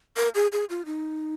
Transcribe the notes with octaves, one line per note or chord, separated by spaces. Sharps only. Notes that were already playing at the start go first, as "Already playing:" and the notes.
A#4
G#4
G#4
F4
D#4